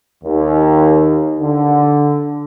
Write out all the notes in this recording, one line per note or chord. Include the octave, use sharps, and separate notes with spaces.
D#2
D3